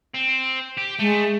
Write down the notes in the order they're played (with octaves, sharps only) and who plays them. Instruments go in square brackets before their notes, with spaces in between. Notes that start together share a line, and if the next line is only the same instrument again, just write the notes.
[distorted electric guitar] C4
G4
[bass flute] G#3 [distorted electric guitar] A3